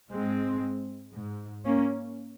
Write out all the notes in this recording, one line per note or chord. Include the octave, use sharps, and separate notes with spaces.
G#2 G#3 C4
G#2
A#3 C#4